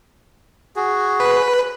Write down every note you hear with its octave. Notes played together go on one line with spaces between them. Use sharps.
F#4 G#4
B4